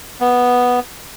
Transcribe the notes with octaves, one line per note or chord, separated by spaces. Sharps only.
B3